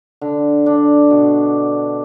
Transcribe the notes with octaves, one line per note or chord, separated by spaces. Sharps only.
D3
D4
B2